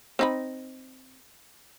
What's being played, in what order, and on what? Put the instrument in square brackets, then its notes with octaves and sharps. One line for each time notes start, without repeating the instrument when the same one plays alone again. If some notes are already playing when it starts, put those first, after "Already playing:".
[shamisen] C4 D#4 B5